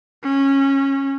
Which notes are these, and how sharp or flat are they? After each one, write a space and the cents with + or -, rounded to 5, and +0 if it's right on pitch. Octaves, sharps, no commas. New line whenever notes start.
C#4 -15